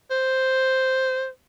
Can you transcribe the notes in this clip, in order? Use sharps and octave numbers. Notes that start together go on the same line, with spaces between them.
C5